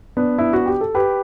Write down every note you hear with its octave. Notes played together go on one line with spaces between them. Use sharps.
B3 D4
E4
F#4
G4
A4
G4 B4